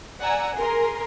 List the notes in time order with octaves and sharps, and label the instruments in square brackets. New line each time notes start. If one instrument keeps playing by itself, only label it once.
[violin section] D5 F#5 G#5 A#5 E6
G#4 A#4 C6